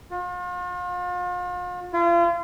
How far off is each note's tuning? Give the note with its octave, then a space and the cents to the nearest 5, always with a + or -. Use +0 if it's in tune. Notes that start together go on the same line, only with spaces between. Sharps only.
F4 +40
F4 -35